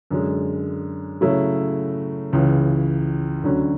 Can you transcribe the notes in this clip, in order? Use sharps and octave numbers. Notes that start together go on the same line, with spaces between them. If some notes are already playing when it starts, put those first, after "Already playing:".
F#2 D3 G#3
C#3 F#3 A3 E4
C#2 C#3 E3
D2 D3 F#3 C#4